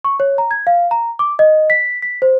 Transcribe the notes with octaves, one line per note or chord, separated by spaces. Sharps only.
C#6
C#5
A#5
G#6
F5
A#5
D6
D#5
B6
B6
C5